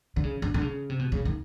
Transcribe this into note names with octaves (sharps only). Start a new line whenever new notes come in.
D3
C#3
D3
D3
C#3
C3
B2
C#3
D#3